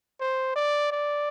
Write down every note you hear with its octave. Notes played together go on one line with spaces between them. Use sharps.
C5
D5
D5